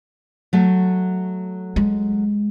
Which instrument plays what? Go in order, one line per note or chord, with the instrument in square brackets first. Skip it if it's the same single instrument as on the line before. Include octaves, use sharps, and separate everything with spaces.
[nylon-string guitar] F#3 A3
[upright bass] G#3